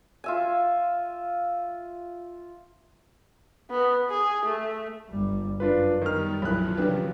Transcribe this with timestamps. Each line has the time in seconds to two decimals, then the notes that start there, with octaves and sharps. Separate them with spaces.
0.24 F4 E5 G#5
3.70 B3
4.10 G#4
4.45 A3
5.09 G1 G3
5.60 F#2 D4 F4 B4
6.02 D#3 G3 B3 F6
6.42 B1 A2 D#3 F3 F#3 B5 F#6
6.77 C#3 G3 D4 B4